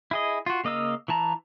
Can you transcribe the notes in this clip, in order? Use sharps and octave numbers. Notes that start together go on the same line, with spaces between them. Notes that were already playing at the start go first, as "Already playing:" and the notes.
E4 G#4 D#5
F4 F#4
C#3 A#3 D#5 F5 E6
E3 E4 A5 A#5